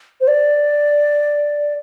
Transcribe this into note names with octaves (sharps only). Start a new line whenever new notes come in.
C5
D5